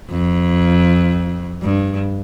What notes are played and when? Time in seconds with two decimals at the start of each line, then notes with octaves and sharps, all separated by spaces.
0.11 F2
1.62 G2